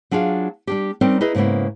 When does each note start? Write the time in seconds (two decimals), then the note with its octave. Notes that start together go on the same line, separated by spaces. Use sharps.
0.11 F#3 D4 F4 G#4 F5
0.67 G3 D4 G4
1.01 G3 C4 C#4 D#4 A#4
1.21 D#4 E4 G#4 B4 D#5
1.35 G#2 C#3 A#3 B3 E4